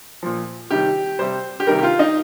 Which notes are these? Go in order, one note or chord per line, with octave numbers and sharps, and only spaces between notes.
A#2 F3
C3 D#3 G3 G4
C3 G3 C5
G4
C3 D#3 G3 A#4
G4
F4
D#4